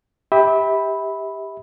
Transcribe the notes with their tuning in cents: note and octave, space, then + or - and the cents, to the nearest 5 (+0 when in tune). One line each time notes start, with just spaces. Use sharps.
G4 +15 E5 -30 B5 +0